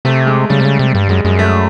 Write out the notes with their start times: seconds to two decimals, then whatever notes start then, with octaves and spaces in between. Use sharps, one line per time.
0.05 C3 A3
0.27 G#3
0.50 C#3 G3
0.60 C3
0.65 C#3
0.79 C3
0.94 G2 G3
1.09 F#2 G#3
1.25 F#2 G#3
1.39 A3